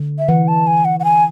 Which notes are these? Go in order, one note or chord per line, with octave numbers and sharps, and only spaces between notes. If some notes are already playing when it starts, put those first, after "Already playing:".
Already playing: D3
E5
E3 F#5
A5
G#5
F#5
F#5
G#5